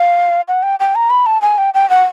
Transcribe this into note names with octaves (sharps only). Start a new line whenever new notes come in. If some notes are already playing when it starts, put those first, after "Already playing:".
Already playing: F5
F#5
G5
G5
A#5
B5
A5
G#5
G5
G5
F#5